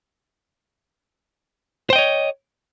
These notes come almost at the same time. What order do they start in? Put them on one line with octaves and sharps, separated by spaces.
C5 G5 D#5 C#5